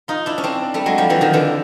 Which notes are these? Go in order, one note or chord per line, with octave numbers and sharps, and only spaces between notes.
D#4 F4
D4 E4
C#4
C4 D4
G3 A3
F#3 G#3
F3 G3
E3 F#3
D#3 F3
D3 E3